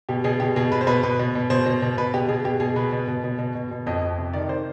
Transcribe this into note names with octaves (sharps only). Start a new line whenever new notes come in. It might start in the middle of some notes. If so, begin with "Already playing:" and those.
B2 G4
B2 G#4
B2 G4
B2 G#4
B2 B4
C5
B2 B4
B2 B4
B2
B2
B2 C5
B2
B2
B2 B4
B2 G4
B2 G#4
B2 G4
B2 G#4
B2 B4
B2
B2
B2
B2
B2
B2
F2 D#5
F2
C3
D#3 D5
D#3 C5